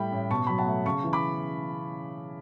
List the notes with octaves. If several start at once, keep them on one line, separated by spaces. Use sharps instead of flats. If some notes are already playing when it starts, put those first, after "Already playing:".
Already playing: A2 G3 G5 B5
A1
B2 A5 C#6
F#3 B5
F#5 A5
A3
C#3 A5 C#6
E3
B5 D6